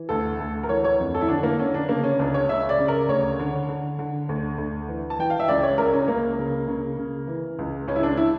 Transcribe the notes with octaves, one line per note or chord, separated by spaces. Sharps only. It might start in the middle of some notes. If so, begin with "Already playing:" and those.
Already playing: E3
D2 A4
D2
A#4
E3 C#5
C#5
F2
A4
E4
D3 D4
A#3
D3 C#4
D4
C#3 A#3
C#4
C#2 D4
C#5
C#3 E5
D5
C#3
A#4
D2 C#5
D3
D3
D3
D2
D2
E3
A5
E3 G5
F5
E5
C#2 D5
C#5
C#2 A#4
C#4
C#2 A#3
C#3
C#3
C#3
E3
C#2
C#2 C#4
E4
D4
E4